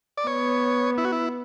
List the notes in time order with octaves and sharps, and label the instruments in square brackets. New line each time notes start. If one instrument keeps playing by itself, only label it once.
[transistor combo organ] D5
[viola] B3 [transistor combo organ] C#5
[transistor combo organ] E4
F#4
E4